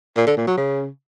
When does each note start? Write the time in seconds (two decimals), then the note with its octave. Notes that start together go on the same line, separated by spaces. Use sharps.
0.17 A#2
0.27 D3
0.37 A#2
0.47 F#3
0.57 C#3